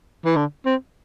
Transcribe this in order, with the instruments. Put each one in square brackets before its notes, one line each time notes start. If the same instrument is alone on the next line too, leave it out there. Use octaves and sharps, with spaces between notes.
[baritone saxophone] E3
D3
C4